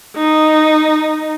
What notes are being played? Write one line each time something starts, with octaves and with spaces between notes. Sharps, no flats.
D#4